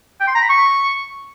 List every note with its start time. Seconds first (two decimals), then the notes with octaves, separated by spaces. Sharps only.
0.20 G5
0.28 C6
0.35 A#5
0.42 B5
0.49 C#6